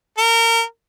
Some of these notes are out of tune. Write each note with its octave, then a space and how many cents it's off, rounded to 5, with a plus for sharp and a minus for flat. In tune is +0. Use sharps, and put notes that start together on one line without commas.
A#4 -25